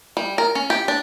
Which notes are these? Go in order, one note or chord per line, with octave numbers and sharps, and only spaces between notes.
G3
A#4
C#4
G4
D4